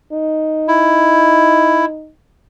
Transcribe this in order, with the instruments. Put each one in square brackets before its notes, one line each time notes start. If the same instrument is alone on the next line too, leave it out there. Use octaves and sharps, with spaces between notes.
[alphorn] D#4
[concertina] E4